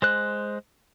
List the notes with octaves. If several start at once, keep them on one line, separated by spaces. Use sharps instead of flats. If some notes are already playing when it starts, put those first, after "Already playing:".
G#3 C5 F#6